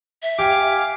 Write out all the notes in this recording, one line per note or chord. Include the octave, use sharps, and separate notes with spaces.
E5
G4 F5 G#5 D6